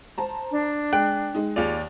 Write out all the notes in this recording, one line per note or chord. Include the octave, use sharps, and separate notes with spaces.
C5 A5 A#5
D4
G#3 G5 F#6
G#3 D#4
D#2 F4 G#4 D5 F7